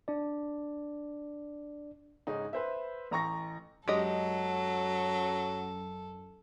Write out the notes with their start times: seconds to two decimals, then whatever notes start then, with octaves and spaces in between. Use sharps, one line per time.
0.08 D4 D5
2.27 G#2 C#3 C#4 D#4
2.53 B4 C5 E5
3.11 A1 A#5 C#6 A#6
3.88 F#2 F#3 G#3 G4 A4 D#5